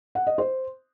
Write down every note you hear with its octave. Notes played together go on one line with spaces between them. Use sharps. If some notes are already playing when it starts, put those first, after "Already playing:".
F#5
D#5
C5